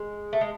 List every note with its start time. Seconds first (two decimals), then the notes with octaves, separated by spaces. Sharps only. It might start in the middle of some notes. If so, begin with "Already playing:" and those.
Already playing: G#3
0.33 A3
0.41 G#3